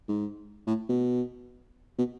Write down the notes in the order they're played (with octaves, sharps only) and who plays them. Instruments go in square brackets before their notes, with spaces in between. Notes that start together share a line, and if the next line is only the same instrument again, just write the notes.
[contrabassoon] G#2
A2
B2
B2